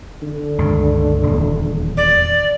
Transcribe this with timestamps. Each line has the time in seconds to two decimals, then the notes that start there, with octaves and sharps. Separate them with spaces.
0.22 D3
0.58 C#2 G2 D#3
1.23 D#1 E2
1.97 D5